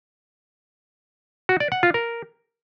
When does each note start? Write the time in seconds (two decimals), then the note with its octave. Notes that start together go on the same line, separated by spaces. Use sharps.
1.49 F#4
1.60 D5
1.72 F#5
1.83 F4
1.94 A#4